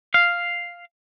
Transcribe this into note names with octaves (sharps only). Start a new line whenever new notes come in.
F5